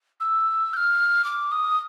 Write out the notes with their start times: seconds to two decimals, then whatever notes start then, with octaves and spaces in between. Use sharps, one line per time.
0.20 E6
0.73 G6
0.76 F6
1.24 D6
1.51 D#6